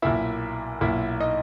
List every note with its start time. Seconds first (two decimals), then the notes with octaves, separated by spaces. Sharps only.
0.02 B1 A#2 A#3 E4 E5
0.81 B1 A#2 A#3 E4 E5
1.20 D#4 D#5